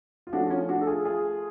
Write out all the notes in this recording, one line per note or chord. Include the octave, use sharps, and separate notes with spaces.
F4
F3 A3 C#4 D4 F#4
F#4
C#4 F4
D4 F#4
A4
F4 G#4
F4 G#4